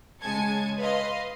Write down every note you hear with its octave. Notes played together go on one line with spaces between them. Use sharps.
C#3 G#3 G#5 A5 G#6 C#7
B4 D#5 F5 C6